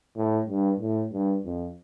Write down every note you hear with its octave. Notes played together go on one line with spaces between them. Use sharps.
A2
G2
A2
G2
F2